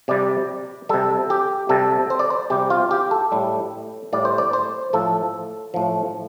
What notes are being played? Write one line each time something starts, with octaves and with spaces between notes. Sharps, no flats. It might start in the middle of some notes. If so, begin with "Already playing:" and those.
C3 G3 D5
C3 G3 A4
G4
C3 G3 A4
C5
D5
C5
C3 G3 G4
F4
G4
A4
A2 G3
A2 G3 D5
C5
D5
C5
A2 F3 A4
A2 F3